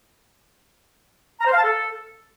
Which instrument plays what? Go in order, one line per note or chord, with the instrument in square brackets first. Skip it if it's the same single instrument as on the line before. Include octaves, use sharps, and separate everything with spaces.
[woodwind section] A#5
C5
F5
A5
A4